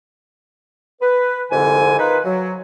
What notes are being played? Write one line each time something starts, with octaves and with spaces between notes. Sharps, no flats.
B4
C2 F2 G#2 D3 G#5
D#4 F4 A#4 B4
F#3